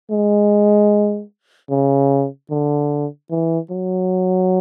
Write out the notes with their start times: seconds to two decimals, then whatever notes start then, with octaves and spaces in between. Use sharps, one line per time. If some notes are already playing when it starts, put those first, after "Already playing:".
0.11 G#3
1.71 C#3
2.51 D3
3.31 E3
3.71 F#3